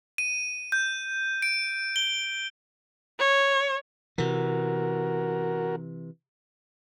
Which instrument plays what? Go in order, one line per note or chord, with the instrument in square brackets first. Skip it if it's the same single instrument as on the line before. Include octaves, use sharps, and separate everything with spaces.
[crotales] D#7
G6
D7
G7
[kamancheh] C#5
[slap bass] C3 E3 [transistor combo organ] F#4 A#4